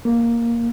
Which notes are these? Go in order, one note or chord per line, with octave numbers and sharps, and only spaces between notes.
A#3